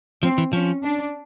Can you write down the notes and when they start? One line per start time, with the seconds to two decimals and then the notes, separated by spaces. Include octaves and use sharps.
0.23 F3 C4
0.38 E3
0.53 F3 C#4
0.83 D4